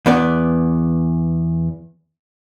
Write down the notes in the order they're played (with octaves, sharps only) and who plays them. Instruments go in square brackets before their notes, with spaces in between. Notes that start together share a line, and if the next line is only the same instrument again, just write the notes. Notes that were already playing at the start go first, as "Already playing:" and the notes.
[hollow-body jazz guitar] E2 B3 D5